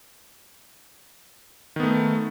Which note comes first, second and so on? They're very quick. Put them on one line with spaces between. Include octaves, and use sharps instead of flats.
D#3 B3 A3